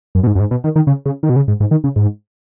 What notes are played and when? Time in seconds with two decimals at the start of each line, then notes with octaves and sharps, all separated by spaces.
0.15 F#2
0.23 B2
0.27 G#2
0.35 F#2
0.40 G#2
0.51 B2
0.64 D#3
0.76 D#3
0.87 C#3
1.06 C#3
1.23 D#3
1.30 B2
1.36 C#3
1.48 G#2
1.60 G#2
1.71 D#3
1.84 C#3
1.96 G#2